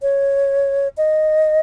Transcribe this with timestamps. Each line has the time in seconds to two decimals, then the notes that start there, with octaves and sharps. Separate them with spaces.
0.02 C#5
0.97 D#5